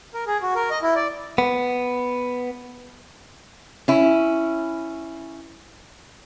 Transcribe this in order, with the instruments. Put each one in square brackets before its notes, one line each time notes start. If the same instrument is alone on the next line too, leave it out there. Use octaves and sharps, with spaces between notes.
[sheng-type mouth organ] A#4
G#4
F#4
A#4
D#5
E4
D5
[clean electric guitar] B3
[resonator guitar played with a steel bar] C#4 E4